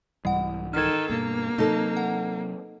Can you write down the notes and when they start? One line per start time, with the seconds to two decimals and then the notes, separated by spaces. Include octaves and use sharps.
0.25 C2 G#2 E3 G3 F#5
0.73 D#3 A4 F6 G#6
1.10 G2 B2 A#3
1.58 C3 F#3 D#4 A4
1.97 F#5